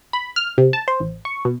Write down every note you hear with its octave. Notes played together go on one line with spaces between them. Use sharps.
B5
F6
C3
A5
C5
A1
C#6
B2